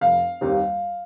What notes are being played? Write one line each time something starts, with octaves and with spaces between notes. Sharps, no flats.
F1 F5
D#2 D#3 G3 C4